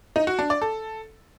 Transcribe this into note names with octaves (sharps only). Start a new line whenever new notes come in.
D#4
F#4
D4
D5
A4